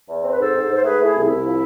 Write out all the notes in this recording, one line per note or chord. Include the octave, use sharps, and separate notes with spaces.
E2
C4 C5
B4
G#2 A4 C5
G#2
G#2
C5
A3 G#4 B4
A3
E4 G#4
C2
C2 E4
F3